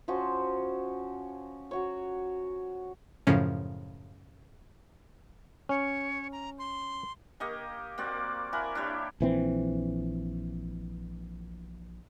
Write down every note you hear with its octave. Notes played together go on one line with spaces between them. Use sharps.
F3 C#4 F#4 C5
F#3 F#4 C#5
F#2 A2 C#3 F3 C#4
C#4 C#5
A#5
C6
A#3 G4 D#5 C#6
A#3 C4 F#4 D5
E4 A#4 F#5 G#5
D4 E4 G4 C#5
A#1 E3 C4